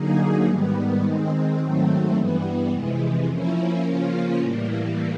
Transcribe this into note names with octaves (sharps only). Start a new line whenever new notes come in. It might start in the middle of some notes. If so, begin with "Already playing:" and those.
Already playing: D3 F#3 A#3 D#4 G#4
G#2 D#3 G3 B3
D#3 G#3 C4
G#2 D#3 F#3 A3 C4
G2 E3 G3 B3
F2 C3 E3 G#3
F3 A#3 C#4 E4
C#3 F3 A#3 C#4 F4
A2 E3 G3 A#3